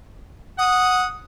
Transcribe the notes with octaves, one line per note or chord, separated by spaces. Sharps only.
F#5 D#6